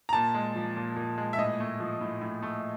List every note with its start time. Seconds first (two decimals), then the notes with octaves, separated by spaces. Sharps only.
0.09 A#5
0.13 A#2 A5
0.35 G#3
0.56 F3
0.77 A#2
0.96 A#2
1.18 G#3
1.33 E5
1.39 A2 D#5
1.60 A3
1.80 F3
2.01 A2
2.22 A2
2.43 A3